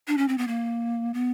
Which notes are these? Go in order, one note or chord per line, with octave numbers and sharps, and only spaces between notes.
D4
C#4
C4
B3
A#3
B3